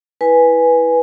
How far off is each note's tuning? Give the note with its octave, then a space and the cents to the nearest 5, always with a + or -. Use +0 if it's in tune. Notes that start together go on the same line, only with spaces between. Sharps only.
E4 -10 B4 -10 G#5 +0